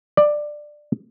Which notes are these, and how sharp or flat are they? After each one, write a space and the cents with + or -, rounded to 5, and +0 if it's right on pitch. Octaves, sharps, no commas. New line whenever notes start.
D5 +15